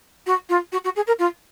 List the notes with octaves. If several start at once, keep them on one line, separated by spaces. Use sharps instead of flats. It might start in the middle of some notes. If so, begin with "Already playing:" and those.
F#4
F4
F#4
F#4
G#4
A#4
F4